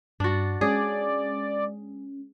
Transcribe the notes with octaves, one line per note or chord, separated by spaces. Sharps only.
G2 D4 F#4 A6
G#3 C#4 G#4 D5